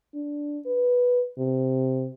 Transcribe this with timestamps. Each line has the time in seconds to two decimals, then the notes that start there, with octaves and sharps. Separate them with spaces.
0.15 D4
0.66 B4
1.39 C3